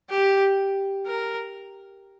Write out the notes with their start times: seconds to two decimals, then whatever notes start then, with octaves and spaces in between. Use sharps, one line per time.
0.10 G4
1.07 A#4